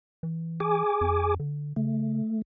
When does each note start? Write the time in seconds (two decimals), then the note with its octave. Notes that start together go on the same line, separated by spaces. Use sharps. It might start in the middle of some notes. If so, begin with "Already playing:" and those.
0.23 E3
0.60 G#4 G#5 D6
1.01 F2
1.39 D3
1.76 C#3 A3